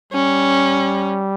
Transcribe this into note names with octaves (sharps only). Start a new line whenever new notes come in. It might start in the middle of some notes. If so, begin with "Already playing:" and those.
G3 C#4